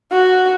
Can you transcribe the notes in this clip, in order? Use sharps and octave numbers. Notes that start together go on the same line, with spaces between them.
F#4